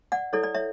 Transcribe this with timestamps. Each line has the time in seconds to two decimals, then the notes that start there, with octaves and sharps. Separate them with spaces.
0.12 D5 F#5
0.33 E4 A4 C#5 D5
0.43 D5
0.54 C#5 E5